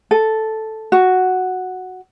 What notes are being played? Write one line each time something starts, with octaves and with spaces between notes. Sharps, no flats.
A4
F#4